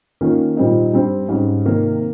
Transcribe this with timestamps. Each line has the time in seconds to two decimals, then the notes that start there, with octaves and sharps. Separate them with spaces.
0.21 D#3 A#3 C#4 F4
0.57 A#2 G3 C4 D#4
0.93 G2 G3 C4
1.29 G#2 G3 C#4
1.65 C3 D#3 A#3